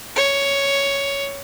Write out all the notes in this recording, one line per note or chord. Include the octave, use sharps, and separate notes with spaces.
C#5